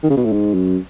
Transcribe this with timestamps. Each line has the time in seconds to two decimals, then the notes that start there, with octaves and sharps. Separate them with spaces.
0.03 D#3
0.10 C#3
0.17 B2
0.25 A2
0.32 G#2
0.54 F#2